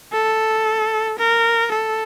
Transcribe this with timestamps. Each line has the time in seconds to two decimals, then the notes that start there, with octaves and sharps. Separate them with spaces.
0.13 A4
1.18 A#4
1.71 A4